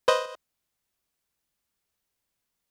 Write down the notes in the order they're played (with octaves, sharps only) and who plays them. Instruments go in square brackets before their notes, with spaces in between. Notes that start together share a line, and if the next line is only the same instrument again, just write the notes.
[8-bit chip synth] B4 C5 D#5